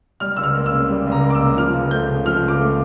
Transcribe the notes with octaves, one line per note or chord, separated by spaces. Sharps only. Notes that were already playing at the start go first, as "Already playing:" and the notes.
G3 F6
C#2 E6
F6
A#3
E6
C#3
G3
C#2
A#5
A#3
D6
E6
C#3
F3 F6
C#2
A3 G6
C#3
F3 F6
C#2
D6
A3